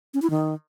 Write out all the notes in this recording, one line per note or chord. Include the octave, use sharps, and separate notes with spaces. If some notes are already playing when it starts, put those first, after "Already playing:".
C#4
E4
D#3